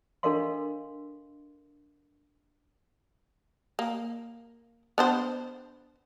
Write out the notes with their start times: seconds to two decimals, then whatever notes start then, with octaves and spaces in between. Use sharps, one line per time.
0.23 D4 A4 A#4 D#5 F5 C6
3.79 A#3
4.98 B3 D4 C5